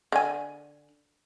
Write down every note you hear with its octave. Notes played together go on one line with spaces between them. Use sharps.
D3 G#5